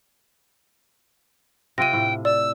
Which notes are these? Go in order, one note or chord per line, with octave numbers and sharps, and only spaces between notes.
C3 F4 G5 A#6 D#7
A2
D5 E6